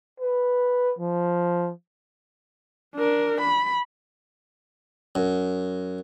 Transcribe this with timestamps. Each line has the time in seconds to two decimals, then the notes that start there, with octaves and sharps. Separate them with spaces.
0.20 B4
0.99 F3
2.95 D4 A#4
3.41 B5
5.15 F#2